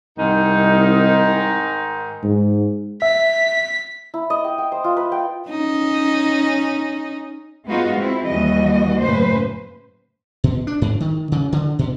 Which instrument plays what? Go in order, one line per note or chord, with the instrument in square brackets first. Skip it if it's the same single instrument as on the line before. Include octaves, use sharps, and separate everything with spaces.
[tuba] C2 [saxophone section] G#2 D#3 D#4
[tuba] G#2
[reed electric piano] E5 [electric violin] B6
[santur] E4
D#5
G5
G5
C5
F4
B4
G5
[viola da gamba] C#4 D#4
[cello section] G#3 B3 D#4 F4 F#4
C4 E4
D#2 E3 G3 F#4 D#5
F#2 A2 C#3 A#3 B4 C5
[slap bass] B2
D4
G#2
D#3
C#3
D3
B2